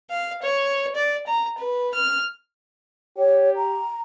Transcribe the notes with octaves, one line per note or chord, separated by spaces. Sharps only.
F5
C#5
D5
A#5
B4
F6
G4 C#5
A#5